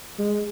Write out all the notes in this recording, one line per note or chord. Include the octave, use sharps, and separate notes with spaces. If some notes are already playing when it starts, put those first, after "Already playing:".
G#3